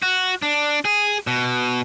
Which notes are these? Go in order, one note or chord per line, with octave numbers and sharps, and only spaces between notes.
F#4
D4
G#4
B2